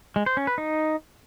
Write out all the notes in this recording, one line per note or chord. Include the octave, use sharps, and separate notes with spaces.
G#3
C5
C#4
B4
D#4